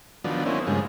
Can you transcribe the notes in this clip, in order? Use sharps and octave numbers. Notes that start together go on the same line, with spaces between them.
D#3 F3 F#3 B3 D4
A#3 C4 C#4 D#4 E4
G2 C#3 F3 G#3